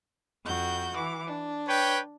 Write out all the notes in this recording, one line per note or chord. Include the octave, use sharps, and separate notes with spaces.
F2 F#4 G6
E3 D6
D4
B4 C#5 G5